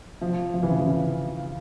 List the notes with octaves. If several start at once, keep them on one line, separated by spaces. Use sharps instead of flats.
F3
F3
E3
C#3
E3
C#3